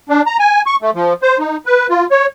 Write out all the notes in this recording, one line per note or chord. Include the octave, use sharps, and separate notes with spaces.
D4
A#5
G#5
C#6
A3
F3
C5
D#4
B4
F4
C#5